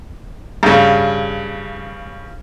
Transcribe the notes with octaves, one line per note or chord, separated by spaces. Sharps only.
G2 C#3